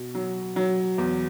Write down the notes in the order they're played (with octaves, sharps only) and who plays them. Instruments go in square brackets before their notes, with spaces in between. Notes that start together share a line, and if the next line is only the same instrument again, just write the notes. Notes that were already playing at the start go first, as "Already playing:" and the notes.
Already playing: [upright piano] B2
F#3
F#3
E2